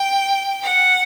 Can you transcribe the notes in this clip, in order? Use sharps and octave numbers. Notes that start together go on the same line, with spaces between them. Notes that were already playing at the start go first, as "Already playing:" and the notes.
Already playing: G5
F#5